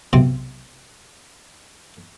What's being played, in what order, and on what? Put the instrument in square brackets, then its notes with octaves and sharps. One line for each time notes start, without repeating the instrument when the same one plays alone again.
[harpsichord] B1 C3 C4